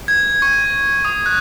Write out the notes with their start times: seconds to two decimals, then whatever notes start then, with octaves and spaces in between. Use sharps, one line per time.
0.08 G#6
0.42 C#6
1.05 D#6
1.26 F#6